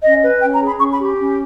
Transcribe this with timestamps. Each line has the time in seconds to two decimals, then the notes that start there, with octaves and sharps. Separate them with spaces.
0.03 C#4 D#5
0.23 B4
0.41 C#4 G5
0.54 A#5
0.60 G#4
0.66 B5
0.79 C#4 C#6
0.92 B5
0.98 G4
1.18 C#4